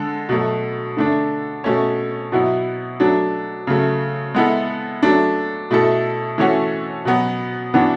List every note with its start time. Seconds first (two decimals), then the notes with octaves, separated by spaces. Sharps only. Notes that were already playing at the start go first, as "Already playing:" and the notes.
Already playing: D3 G#3 A4
0.29 B2 F#3 A3
0.97 D3 A3 D4
1.64 B2 A3 C#4
2.32 B2 F#3 B3 E4
3.00 F#3 A3 D4
3.67 C#3 F#3 A3
4.35 G#3 B3 E4 A4
5.03 F#3 A3 D4
5.71 B2 A3 E4 A4
6.38 E3 A3 C#4 F#4 A4
7.05 B2 F#3 B3
7.74 E3 B3 D4 F#4